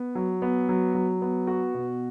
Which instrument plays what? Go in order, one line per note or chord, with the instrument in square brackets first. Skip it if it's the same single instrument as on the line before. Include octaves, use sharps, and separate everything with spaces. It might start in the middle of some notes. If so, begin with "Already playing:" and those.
Already playing: [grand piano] B3
F#3
B3
F#3
F#3
B3
F#4
B2